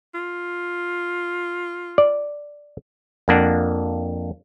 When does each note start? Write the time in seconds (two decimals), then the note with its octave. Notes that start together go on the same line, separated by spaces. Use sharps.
0.14 F4
1.98 D5
3.28 F2 A#3 D4 F#5